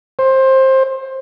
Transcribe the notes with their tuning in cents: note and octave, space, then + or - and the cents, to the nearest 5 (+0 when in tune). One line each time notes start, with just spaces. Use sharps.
C5 +20